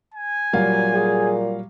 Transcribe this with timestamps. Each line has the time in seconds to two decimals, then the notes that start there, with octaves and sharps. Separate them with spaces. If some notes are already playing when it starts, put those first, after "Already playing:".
0.14 G#5
0.53 A#2 F#3 G3 F5
0.94 G#4